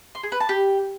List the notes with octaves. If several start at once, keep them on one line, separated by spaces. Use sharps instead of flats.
C6
G#4
B4
A5
G4